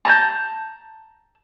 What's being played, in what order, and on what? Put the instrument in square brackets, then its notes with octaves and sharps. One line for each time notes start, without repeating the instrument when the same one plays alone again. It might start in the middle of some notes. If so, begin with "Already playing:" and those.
[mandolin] A5 A#5 F6 G6